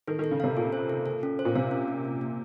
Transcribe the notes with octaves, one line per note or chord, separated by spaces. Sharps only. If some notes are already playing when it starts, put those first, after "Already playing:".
D#3 A4
D#3 A4
C#3
C3 F5
A#2 A4
C5
A4
A4
C#4
C5
A#2
C3 F5
C#4
C#4
A#3
A#3